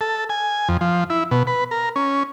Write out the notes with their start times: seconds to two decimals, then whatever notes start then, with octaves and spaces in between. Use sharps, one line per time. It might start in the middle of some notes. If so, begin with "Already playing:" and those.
0.01 A4
0.29 G#5
0.69 F2
0.81 F3
1.10 E4
1.31 B2
1.47 B4
1.71 A#4
1.96 C#4